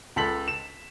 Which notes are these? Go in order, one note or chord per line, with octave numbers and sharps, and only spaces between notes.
C#2 A4 B6 F#7
E7